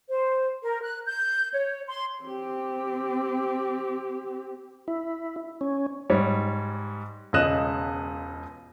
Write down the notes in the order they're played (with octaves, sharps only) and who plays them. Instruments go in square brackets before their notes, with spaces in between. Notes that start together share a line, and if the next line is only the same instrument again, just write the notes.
[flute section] C5
A#4
F#6
G6
C#5
C6
[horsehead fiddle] C4 G4
[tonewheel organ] E4
C#4
[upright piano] G#2 G3 C#5
E1 C#2 C#3 D#5 F#6 E7